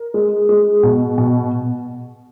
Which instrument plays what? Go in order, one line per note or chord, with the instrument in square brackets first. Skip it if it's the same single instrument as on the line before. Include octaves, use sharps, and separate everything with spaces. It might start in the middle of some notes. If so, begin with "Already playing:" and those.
Already playing: [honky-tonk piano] A#4
G#3
G#3
B2
B2